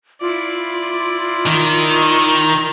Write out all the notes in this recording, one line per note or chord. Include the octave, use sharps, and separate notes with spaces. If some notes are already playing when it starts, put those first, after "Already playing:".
E4 F4 D5
D#3